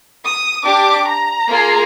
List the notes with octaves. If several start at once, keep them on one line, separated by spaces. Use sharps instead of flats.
D#6
D4 G4 D6
A#5
A#3 F4 G#4